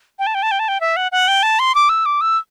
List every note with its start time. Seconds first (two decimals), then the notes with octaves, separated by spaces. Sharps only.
0.19 G5
0.27 A5
0.35 G5
0.43 A5
0.51 G5
0.59 A5
0.68 G5
0.81 E5
0.96 F#5
1.12 F#5
1.28 G5
1.43 A5
1.59 C6
1.75 D6
1.89 E6
2.06 D6
2.21 E6